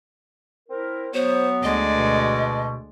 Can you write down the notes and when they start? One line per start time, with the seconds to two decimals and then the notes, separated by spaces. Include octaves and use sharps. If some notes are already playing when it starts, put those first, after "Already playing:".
0.69 C4 E4 A#4
1.14 F#3 B3 C5 C#5
1.63 D2 G#3 D5 D#5
1.94 B2